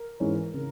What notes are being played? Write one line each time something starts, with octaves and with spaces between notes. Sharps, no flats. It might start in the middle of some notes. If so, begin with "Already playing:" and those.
Already playing: A#4
G#2 E3 G#3 C#4
C#3 A#4